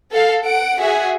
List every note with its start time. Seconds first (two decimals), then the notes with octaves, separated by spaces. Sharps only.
0.11 A4 F5
0.44 F#5 D7
0.80 F#4 G#4 E5 F#5